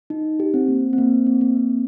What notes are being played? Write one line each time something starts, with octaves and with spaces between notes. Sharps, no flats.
D#4
G4
C4
A#3
C4
A#3
C4
A#3
C4